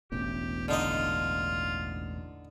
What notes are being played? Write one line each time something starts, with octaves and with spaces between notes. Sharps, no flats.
E1 A1 E2 G4
D3 D#4 F4 D#5